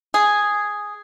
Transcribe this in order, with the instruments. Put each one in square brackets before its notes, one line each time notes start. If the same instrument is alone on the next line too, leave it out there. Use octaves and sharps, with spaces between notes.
[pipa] G#4